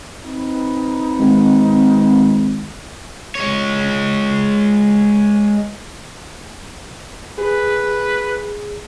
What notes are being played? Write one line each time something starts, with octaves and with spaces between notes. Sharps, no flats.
C4 D#4 B4
G#1
G#3 C#5
G#4 B4